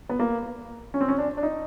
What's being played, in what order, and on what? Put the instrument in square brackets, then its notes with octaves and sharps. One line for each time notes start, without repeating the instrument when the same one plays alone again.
[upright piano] B3
A#3
C#4
C4
C#4
D4
D4
D#4